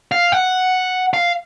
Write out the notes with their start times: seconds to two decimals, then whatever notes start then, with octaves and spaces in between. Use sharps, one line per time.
0.12 F5
0.32 F#5
1.14 F5